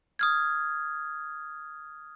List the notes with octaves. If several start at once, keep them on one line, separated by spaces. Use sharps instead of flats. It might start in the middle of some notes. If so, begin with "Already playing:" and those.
D#6 F6 G#6